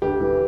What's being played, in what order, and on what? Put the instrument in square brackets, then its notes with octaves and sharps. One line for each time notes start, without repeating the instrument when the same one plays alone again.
[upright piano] D2 G4
E3